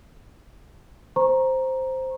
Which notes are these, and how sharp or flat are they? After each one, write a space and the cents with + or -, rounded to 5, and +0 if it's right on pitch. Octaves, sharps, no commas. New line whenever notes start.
C5 +0 A#5 +10 C#6 -25